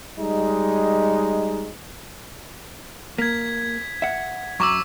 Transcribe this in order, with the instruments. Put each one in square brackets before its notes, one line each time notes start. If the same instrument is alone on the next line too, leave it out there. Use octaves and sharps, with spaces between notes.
[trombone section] G3 G#3 D#4
[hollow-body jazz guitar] A#3 [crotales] G#6 B6
[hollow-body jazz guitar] E5 F#5
[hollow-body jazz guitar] F#2 A#5 [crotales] C#6 D6 E6